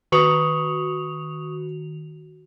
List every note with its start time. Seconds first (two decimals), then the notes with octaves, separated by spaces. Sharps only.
0.12 D#3 F#4 B4 C#6 D#6 F7